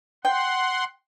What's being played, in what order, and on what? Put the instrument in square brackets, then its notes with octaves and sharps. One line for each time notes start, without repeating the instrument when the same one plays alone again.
[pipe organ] F#5 C6 [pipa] G5